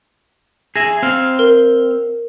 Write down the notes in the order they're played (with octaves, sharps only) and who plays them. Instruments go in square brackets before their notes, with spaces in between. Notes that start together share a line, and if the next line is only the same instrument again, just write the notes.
[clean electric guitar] G#4 E5 [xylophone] A#6
[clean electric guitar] C4 F5
[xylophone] A#4